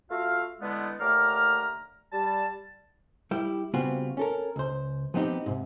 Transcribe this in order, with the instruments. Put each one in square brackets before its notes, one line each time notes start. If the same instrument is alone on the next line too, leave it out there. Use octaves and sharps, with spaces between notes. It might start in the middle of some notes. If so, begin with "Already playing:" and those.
[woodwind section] A3 F4 F#4 E5 F5
D3 E3 G#3 A3 B3
D#2 D3 A3 A#5 D6 F6
G3 A5
[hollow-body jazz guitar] G3 E4 G4
C#3 G3 B3 C4 F4 F#4
C#4 A4 A#4
C#2 C5
F3 B3 C4 D#4 G4
G#2 C3